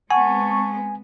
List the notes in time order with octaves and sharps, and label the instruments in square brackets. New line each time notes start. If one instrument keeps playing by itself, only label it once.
[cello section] G#3 B3 C4 [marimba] F#5 [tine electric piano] G#5 [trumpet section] A5 C#6